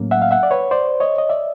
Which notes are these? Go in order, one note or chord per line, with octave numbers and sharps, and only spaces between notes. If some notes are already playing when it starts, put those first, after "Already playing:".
Already playing: A2 F#3 A#3 C#4
E5 F#5
F5
E5 F#5
D5
B4 C#5
C5 D5
C#5 D#5
D#5
D5 E5